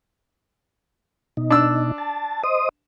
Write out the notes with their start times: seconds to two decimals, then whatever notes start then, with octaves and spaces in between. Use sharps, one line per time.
1.37 B2 D#4
1.50 D4 E6
1.98 A5
2.44 C5 D#5 D#6